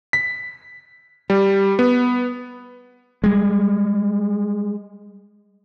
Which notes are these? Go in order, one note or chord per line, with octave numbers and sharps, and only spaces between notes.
B6
G3
B3
G3 G#3